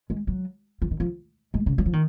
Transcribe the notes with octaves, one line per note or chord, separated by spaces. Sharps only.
G#3
F#3
F3
D#3
F3
G#3
C#3
F#3
F3
D#3